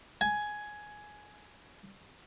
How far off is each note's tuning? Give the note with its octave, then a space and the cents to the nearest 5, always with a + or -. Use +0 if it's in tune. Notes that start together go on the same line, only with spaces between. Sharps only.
G#5 +10